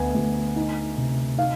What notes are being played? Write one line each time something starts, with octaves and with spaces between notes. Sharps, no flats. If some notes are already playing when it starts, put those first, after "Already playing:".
Already playing: D2 B3 G#5
D2
D#4
C3
D#4 F5